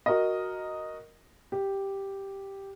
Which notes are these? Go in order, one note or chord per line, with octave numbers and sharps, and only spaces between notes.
F#4 A#4 D#5
G4